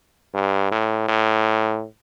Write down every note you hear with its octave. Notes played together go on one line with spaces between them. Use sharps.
G2
A2
A2